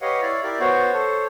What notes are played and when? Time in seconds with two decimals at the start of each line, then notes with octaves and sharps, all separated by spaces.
0.01 G4 B4 C#5 D#5 F5 F#5
0.22 E4 C#5 D5 F5
0.44 E4 G4 A#4 D5
0.60 B3 F#4 C5 C#5
0.93 A4 C5 C#5